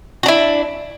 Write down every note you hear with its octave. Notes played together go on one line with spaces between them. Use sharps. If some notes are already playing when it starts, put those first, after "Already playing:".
D4 E4 F#4